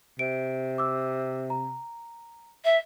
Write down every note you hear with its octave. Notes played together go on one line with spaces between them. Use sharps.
C3 D7
D6 E6
A#5
E5